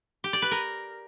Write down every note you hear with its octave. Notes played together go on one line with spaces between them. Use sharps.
G4
D5
B4
A#4